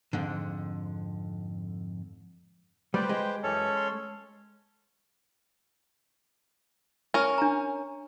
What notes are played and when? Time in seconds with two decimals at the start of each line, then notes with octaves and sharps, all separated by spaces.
0.13 F2 G#2 D3
2.94 G3 G4 B4 C5 D5 G5
3.09 G#3 G5
3.43 F#2 E3 C#4 A4 C#5
3.76 C6
7.14 C#4 A#4
7.38 D4 A#5